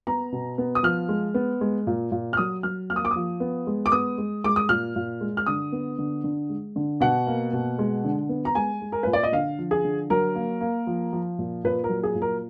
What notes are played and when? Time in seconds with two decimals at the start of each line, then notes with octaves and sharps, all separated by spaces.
0.07 B3 A#5
0.32 B2
0.58 B3
0.75 D#6
0.83 F3 F6
1.09 G#3
1.34 B3
1.61 G#3
1.87 A#2
2.12 A#2
2.33 F6
2.37 F#3 D#6
2.63 F#3 F6
2.90 A#3 F6
2.96 D#6
3.05 D6
3.11 F3 D#6
3.40 B3
3.67 G#3
3.86 D6
3.92 B3 D#6
4.18 G#3
4.44 G#3 D6
4.56 D#6
4.69 A#2 F6
4.96 A#2
5.21 G#3
5.37 F6
5.46 D3 D#6
5.72 B3
5.98 D3
6.24 D3
6.49 G#3
6.76 D3
7.00 B2 F#5
7.27 A#3
7.53 B2
7.79 G#3
8.04 D3
8.29 B3
8.45 A#5
8.55 G#3 G#5
8.81 G#3
8.92 A#4
9.03 A#2 B4
9.13 D5
9.23 D#5
9.32 D3 F5
9.58 F3
9.71 G#4
9.84 D3
10.10 F#3 A#4
10.35 A#3
10.61 A#3
10.87 F3
11.13 F3
11.39 A#2
11.64 A#2 B4
11.84 A#4
11.89 F#3
12.03 G#4
12.15 A#2
12.22 A#4